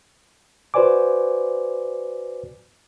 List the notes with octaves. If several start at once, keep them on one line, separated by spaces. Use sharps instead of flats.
F#4 B4 C5 D5 G#5 D6